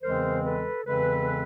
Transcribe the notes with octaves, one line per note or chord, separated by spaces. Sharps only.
E2 C#3 E3 G#3 C4 A#4 C5
A4 B4
E2 C#3 E3 G#3 C4 A4 B4